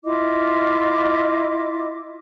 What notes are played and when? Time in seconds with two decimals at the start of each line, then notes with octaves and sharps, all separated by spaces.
0.04 E4 F4 D#5 D6